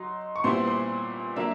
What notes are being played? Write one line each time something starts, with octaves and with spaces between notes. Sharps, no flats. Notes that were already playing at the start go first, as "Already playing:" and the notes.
Already playing: F#3 D#4 C6
C#6
A#2 G3 B3 E4 C5 C6
C5 C6
F#3 A#3 D4 E5 E6